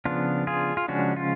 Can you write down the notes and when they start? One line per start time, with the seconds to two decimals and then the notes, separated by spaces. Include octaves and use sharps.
0.05 C#3 F3 B3 D4 F4
0.47 F4 G#4
0.77 F4
0.88 C#3 F3 G#3 C#4 D4 F#4
1.16 F4